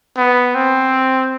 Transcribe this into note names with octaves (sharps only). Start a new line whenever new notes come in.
B3
C4